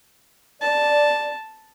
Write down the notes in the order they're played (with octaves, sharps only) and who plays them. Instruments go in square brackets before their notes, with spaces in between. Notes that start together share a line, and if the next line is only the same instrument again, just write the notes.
[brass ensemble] D5 [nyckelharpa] A5